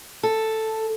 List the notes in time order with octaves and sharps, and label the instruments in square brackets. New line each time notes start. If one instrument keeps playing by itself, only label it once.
[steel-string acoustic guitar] A4